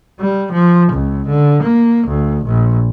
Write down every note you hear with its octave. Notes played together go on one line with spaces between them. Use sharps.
G3
F3
C#2
D3
A#3
D2
A#1